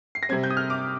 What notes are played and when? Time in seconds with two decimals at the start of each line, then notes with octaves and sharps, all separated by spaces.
0.15 C7
0.23 A#6
0.29 C3 G3 C4 G#6
0.43 G6
0.50 D#6
0.57 F6
0.70 D6